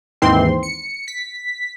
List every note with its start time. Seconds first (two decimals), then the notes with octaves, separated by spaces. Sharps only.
0.22 D#2 G#2 E3 C4 C6
0.63 C#7
1.08 B6